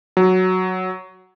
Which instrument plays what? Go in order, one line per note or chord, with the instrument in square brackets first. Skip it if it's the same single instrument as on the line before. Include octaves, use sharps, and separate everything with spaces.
[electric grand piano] F#3